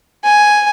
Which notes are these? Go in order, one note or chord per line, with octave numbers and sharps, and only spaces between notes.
G#5